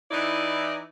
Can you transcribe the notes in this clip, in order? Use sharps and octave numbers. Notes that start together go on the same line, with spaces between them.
E3 D#4 E4 D5